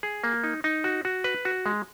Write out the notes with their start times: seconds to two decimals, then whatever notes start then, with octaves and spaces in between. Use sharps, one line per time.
0.03 G#4
0.24 A#3
0.44 D#4
0.64 D#4
0.84 F#4
1.05 F#4
1.24 B4
1.45 F#4
1.66 G#3